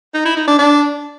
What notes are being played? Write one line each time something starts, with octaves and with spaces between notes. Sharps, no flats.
D#4
E4
D#4
D4
D4